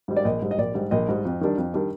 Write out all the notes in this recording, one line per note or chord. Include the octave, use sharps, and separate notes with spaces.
G#2 G3
D5
A#1 D#5
G#2 G3
D#5
A#1 D5
G#2 G3
A#1 D#5
G#2 G3
F2
D#3 G3 D4
F2
D#3 G3 D4